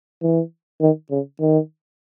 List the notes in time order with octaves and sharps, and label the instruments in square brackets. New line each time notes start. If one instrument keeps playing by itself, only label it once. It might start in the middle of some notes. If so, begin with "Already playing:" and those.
[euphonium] E3
D#3
C#3
D#3